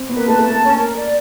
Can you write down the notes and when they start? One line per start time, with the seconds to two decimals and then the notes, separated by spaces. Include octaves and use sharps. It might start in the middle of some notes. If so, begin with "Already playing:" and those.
Already playing: C4
0.09 B3 B4
0.16 A#3
0.28 A3 A5
0.39 A3
0.45 A5
0.50 A#3
0.62 C#4
0.79 A#4
0.96 D5